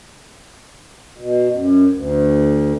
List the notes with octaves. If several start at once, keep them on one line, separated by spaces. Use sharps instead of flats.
B2
F#2
D2